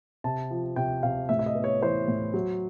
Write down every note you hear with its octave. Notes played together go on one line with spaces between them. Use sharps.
C3 A5
F3
C3 G5
C3 F5
A2 E5
E5
D#5
B3
C#5
E3 C5
A2
F#3